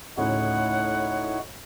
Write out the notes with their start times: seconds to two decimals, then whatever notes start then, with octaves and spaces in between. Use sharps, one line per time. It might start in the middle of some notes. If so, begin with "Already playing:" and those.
0.17 D2 A2 C#3 D#4 E4 C#5 F#5